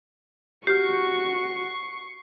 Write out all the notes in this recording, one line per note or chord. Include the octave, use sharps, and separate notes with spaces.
F#4 G4 C#6 F6 C7